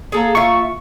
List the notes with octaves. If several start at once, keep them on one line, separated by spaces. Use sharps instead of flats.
A#3 G#4 A4 A#5
F4 E5 C#6